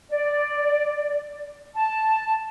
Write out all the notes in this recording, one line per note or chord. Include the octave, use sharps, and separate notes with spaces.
D5
A5